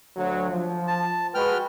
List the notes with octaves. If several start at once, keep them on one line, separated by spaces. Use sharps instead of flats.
D2 F#3
F3
A5
G#3 F#4 B4 G5 F6